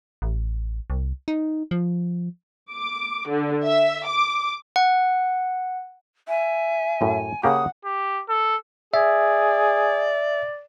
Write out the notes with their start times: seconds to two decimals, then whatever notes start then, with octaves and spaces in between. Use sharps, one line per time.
0.22 A1
0.90 C2
1.28 D#4
1.71 F3
2.71 D6
3.29 D3
3.65 E5
4.06 D6
4.76 F#5
6.28 E5 G#5
7.01 F#2 A2
7.43 C#3 A#3 G4 F#5 D#6
7.85 G4
8.29 A4
8.94 G#4 D5 E5